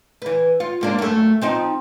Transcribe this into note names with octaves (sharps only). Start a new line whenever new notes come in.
E3 B4
F4
G#2 A#3 D4
F#2 A3
F3 C4 D#4